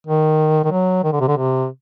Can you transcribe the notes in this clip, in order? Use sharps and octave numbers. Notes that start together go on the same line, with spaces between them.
D#3
D#3
F#3
D#3
D3
C3
D3
C3